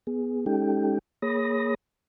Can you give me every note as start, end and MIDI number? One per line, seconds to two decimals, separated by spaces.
0.07 0.45 59
0.07 0.45 68
0.46 0.99 56
0.46 0.99 61
0.46 0.99 63
0.46 0.99 67
0.46 0.99 69
0.46 0.99 79
1.22 1.75 58
1.22 1.75 68
1.22 1.75 73
1.22 1.75 83
1.22 1.75 87
1.22 1.75 94